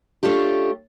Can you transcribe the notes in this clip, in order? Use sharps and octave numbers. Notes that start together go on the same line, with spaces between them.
A3 C#4 D4 F4 G4